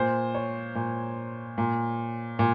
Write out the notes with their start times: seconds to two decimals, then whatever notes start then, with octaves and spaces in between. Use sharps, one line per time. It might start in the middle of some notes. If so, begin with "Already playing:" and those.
Already playing: A#2 C5
0.35 C#5
0.75 A#2
1.58 A#2
2.39 A#2